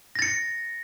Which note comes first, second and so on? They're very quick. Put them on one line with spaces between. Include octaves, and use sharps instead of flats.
A#6 A6 C#7